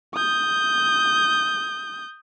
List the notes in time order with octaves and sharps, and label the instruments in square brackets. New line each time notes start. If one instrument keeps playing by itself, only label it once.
[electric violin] D#6 G6